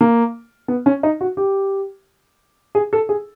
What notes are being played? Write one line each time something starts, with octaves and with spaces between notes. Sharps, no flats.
A#3
B3
C#4
D#4
F#4
G4
G#4
A4
G#4